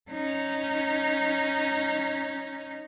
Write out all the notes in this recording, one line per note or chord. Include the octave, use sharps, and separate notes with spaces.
C#4 D#4